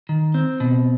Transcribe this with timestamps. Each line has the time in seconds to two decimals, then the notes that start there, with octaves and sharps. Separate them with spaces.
0.09 D#3
0.34 C4
0.60 B2